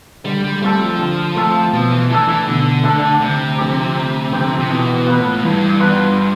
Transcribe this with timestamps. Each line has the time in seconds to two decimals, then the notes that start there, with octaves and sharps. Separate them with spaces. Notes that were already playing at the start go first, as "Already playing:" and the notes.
0.25 D3 G3
0.44 G3
0.62 G3 A3 C4 F4 A4
0.81 F3
0.99 D3
1.36 A3 C4 F4 A4
1.73 B2 F3
1.92 E3
2.10 E3 A3 D4 A4
2.28 E3
2.47 B2 D3
2.84 A3 D4 A4
3.21 D2 C3
3.58 D3 F3 C4 G4
3.95 D2
4.32 D3 F3 C4 G4
4.60 C3
4.69 B2 E3
4.94 B2
5.07 B3 F4 B4
5.19 A2
5.43 G2 E3
5.80 B3 F4 B4